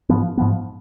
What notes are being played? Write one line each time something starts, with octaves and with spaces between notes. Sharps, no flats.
G#2 F3 B3
G#2 F3 B3